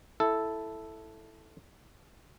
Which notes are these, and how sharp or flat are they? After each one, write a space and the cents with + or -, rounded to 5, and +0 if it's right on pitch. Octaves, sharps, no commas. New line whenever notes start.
E4 +0 A4 +0